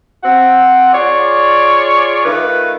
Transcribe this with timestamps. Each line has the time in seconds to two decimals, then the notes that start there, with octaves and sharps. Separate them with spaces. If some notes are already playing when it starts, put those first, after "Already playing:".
0.24 C4 F#5
0.94 F4 G#4 C#5 D5
2.25 D#3 A3 F4 B4